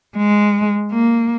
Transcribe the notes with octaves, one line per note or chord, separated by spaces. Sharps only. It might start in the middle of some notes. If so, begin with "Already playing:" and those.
G#3
A#3